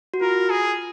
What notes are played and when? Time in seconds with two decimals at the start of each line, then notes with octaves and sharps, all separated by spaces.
0.14 F#4
0.21 F4 A#4
0.50 G#4